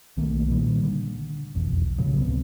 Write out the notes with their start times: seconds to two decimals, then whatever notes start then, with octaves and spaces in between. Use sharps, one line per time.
0.17 B1 D#3 A3 A#3
0.48 D1 A#2 D#3 G3
0.83 D3
1.55 F1 B1 E2
1.98 A#1 A2 C#3 F#3
2.15 C#2 C3 B3